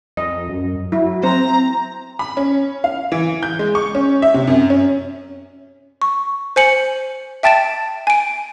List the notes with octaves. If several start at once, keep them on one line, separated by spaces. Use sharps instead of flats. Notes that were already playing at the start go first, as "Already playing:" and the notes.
F2 D#5
F#2
F#3 E4
C4 C5 A#5
B5
C#4
F5
E3
G6
G#3
C#6
C#4
E5
C3
F#2
C#4
C#6
C5 G#5 C#7 F#7
E5 G5 A5 A6 D7 E7
G#5 D7